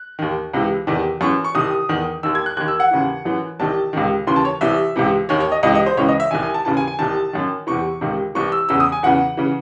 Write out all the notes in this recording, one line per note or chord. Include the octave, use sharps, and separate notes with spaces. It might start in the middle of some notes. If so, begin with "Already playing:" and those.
Already playing: F#6
D#2 D#3
C#2 C3 E3
E2 C3 D#3
F#2 E3 C#6
C#6
C2 C3 D#3 D#6
E2 D#3
D#2 D#3 E6
G#6
F#6
D#2 D#3 F#6
E6
F#5
D#2 C#3 E3
F#2 E3
C2 C3 D#3 A5
C#2 C3 D#3
D#2 C#3 E3 C6
A5
C#5
C2 C3 E3 E5
C#2 C3 E3
D#2 D#3 C#5
C#5
D#5
C#2 C3 E3 D#5
D#5
C5
C#2 C#3 E3 C#5
D#5
E5
C2 C3 D#3 G#5
G#5
A5
D#2 C#3 E3 A5
G#5
G#5
C2 C3 D#3 A5
F#2 D#3
E2 C3 E3 C#6
C#2 C3 D#3
C2 C3 E3 C#6
E6
E2 C#3 E3 E6
D#6
G#5
E2 C#3 E3 F#5
C#3 E3